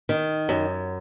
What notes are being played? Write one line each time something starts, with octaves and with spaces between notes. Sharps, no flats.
D#3
F#2